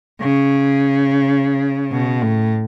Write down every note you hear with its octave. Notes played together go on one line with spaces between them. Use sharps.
C#3
B2
A2